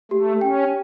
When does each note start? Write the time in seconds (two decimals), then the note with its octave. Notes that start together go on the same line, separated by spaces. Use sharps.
0.11 A3 G4
0.41 C#4 G5